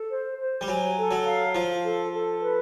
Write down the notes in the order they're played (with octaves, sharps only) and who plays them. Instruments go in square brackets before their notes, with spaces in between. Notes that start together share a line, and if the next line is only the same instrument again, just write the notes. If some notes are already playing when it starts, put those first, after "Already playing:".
Already playing: [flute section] A4
C5
C5
[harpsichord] G3
[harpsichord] F#3 [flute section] G#5
[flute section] A4
[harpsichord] F#3
[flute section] F5
[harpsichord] F3 [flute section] F5
[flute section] A4
A4
B4